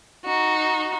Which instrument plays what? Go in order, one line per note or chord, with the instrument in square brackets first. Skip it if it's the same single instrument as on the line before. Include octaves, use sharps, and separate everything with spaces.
[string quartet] D#4 F#4